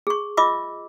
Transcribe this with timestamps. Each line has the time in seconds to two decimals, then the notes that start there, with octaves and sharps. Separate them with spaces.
0.07 G#4 C#6
0.37 F4 D#5 E5 D6 E6